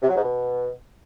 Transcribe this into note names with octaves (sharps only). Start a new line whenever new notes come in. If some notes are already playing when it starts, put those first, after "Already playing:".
C3
F#3
G#2
B2